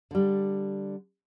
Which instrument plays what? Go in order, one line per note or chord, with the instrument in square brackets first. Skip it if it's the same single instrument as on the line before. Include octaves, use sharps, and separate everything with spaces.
[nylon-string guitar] D3 G3